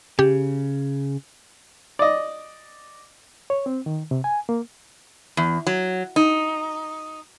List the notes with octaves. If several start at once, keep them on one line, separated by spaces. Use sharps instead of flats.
C#3 G4
D5 D#5
C#5
C4
D#3
C3
G#5
A#3
E2
F#3
D#4